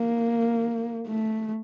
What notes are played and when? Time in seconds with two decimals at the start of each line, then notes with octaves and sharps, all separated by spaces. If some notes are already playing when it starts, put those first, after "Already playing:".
Already playing: A#3
1.07 A3